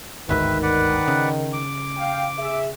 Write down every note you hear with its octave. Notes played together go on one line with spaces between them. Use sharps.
G1 D2 G#2 D#3 B4 E5
B4 D5 F#5
C#3
D6
F5 G5
G#4 E5